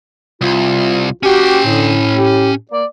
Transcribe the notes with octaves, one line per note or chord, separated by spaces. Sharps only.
C2 F4
C#4 F#4 G4 G5
A2 D3
G4
A#3 D5